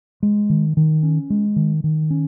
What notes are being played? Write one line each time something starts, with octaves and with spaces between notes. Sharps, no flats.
G#3
D#3
D#3
C#4
G#3
D#3
D#3
C#4